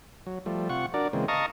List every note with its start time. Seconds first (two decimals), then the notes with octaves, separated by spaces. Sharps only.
0.27 F#3
0.46 F3 G3 A3
0.69 C3 F4 F#5 C#6
0.94 D4 F#4 A#4 D5
1.13 C#3 E3 G#3 A#3 C4
1.28 D#5 F5 A5 A#5 C#6 D#6